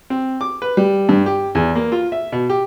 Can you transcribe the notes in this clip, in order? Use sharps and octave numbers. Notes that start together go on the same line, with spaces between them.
C4
D6
B4
G3
G2
G4
E2
A#3
F4
E5
B2
G4